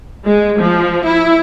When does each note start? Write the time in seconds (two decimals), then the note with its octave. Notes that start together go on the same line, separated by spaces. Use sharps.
0.24 G#3
0.58 F3
1.05 E4